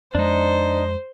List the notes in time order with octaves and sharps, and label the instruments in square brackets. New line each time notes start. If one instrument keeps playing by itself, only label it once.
[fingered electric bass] F2 G#3 [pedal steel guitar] D4 D#4 [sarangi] C5